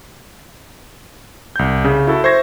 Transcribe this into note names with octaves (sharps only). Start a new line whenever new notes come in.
C2 G6
C#3
E4 F#4 A4
C5 E5 C#6 G#6 A#6